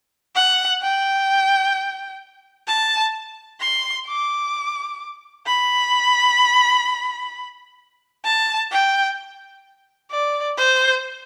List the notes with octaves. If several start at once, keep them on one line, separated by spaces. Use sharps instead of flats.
F#5
G5
A5
C6
D6
B5
A5
G5
D5
C5